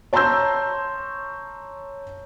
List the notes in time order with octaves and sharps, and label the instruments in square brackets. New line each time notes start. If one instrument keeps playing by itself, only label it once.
[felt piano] C#5 A5 A#5 C6 E6 G6